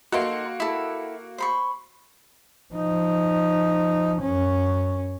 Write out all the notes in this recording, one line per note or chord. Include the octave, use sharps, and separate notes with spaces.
A#3 D#4 F#4 A4 C6
E4 A4
C5 B5 C#6
F3 D#4
F#2 C#4